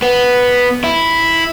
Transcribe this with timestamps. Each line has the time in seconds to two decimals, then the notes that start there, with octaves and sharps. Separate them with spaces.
0.02 B3
0.84 E4